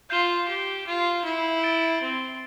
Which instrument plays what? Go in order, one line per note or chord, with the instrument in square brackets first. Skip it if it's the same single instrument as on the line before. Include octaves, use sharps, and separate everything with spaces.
[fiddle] F4 [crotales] G6 C7 E7 G7
[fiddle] G4
F4
E4
[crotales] A6 D7 G7
[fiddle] C4